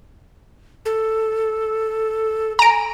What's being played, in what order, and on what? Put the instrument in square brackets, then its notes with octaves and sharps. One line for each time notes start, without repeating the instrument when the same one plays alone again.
[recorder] A4
[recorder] G#5 [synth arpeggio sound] A#5 D7